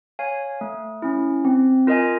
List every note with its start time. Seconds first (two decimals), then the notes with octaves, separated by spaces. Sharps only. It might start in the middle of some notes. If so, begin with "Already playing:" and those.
0.19 C#5 F5 G#5
0.61 A3
1.02 C#4 E4
1.45 C4
1.87 F4 A#4 D#5 G#5